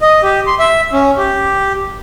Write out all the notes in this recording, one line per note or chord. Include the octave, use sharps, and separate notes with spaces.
D#5
G4
C6
E5
C#4
G4